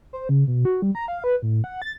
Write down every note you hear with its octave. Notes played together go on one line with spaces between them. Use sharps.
C5
C#3
B2
F#4
G3
A#5
F5
B4
A2
F#5
A6